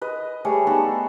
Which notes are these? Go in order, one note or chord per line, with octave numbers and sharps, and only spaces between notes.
B4 D#5
G3 A3 G#4 C#5
B3 D#4 A4 B5